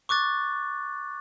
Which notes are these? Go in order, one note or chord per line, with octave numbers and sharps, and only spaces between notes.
C#6 D6 F#6 A6